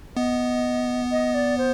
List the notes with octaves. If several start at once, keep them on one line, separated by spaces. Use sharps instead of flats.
B3 D#5
D#5
D5
C5